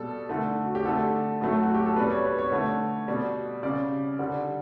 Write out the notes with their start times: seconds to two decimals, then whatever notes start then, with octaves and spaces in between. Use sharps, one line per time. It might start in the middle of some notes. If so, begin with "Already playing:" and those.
Already playing: B2 G3 A4
0.29 D3 A3
0.65 F#4
0.75 G4
0.85 D3 A3 A4
1.41 A2 F#3 A3
1.63 F#4
1.74 G4
1.86 A4
1.96 B2 G3 B4
2.11 C#5
2.24 B4
2.38 C#5
2.52 D3 A3
3.08 B2 G3
3.63 C#3 G3 D5
4.19 D3 G3